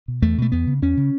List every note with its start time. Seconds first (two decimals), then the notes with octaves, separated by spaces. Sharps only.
0.08 B2
0.22 E2 A3
0.38 B2 A3
0.52 E2 B3
0.67 C#3
0.82 E2 C#4
0.97 C#3